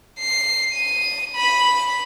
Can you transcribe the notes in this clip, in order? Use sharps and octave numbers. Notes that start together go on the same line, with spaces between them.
C7
D#7
B5